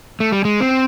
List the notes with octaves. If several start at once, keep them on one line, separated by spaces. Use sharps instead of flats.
A3
G3
G#3
C4